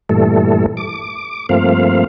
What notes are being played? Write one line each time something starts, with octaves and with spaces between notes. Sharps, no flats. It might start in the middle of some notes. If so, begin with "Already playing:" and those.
G2 A#2 E3 G3 A3 A4
D6
G2 F3 A3 A#3 C4 F5